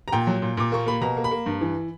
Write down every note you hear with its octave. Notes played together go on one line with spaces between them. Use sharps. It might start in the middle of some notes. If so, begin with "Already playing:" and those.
A#5
A#2 G5
F#3
A#2
A#2 D6
A#3 C#6
A#3 B5
B2 A#5
A#3
B5
A#3
G2
E3